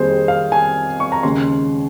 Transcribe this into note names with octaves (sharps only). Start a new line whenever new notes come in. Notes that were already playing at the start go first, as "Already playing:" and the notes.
Already playing: F2 D#3 G3 A#3 G#4 C5
F5
G#5
C#6
A#5
D#2 C#3 G#3 C#4 C6